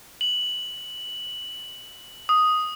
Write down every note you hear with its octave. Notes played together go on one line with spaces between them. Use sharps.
F#7
D#6